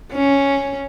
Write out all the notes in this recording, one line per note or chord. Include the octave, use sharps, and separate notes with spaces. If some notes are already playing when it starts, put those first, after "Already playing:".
C#4